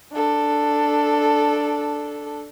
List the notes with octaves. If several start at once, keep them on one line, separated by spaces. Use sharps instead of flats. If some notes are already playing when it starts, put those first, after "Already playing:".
D4 A4